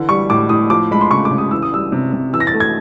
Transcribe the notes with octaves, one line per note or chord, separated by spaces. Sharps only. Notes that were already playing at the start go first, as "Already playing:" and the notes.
Already playing: D3 E3
G3 C#6
A2 D6
A2 D#6
F3 D6
G#3 B5
C6
C#3 C#6
D6
C#3
D#6
E3 E6
D#6
G3 E6
C3
C3
E3 E6
A#6
A6
A3
G#6